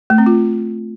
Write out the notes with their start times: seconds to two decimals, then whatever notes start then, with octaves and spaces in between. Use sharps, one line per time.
0.10 A3
0.18 C4
0.26 F4